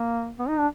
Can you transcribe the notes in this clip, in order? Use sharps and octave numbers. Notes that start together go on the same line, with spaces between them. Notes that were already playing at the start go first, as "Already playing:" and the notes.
Already playing: A#3
B3
D#4
D4